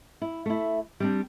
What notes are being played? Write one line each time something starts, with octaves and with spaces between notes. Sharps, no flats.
E4
A3 E4
G3 C4 D4